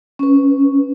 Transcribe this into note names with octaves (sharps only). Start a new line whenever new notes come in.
C#4 B4